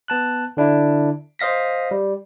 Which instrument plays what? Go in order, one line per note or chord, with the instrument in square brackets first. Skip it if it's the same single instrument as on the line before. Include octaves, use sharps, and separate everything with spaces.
[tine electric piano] B3 A5 F#6
D3 D4 E4
C5 D#5 F5 A#6 B6
G3